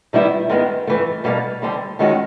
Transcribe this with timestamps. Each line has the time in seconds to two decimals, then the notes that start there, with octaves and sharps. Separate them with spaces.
0.13 D#3 G3 B3 E4
0.49 G#2 D#3 G#3 B3
0.87 G2 E3 A3
1.24 B2 G3 A#3 D4
1.62 D#2 D3 G3 C4
1.99 D#2 D#3 G#3 C#4 F#4